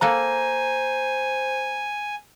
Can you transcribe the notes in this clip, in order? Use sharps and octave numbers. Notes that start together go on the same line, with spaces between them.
A#3 A4 C5 F#5 G#5 A#5